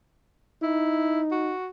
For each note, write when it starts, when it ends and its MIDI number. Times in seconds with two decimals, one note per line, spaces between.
0.62 1.53 63
0.62 1.21 64
1.31 1.69 66